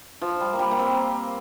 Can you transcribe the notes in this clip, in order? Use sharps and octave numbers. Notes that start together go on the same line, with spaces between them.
F3
G3
A#3
G3
A#3
C4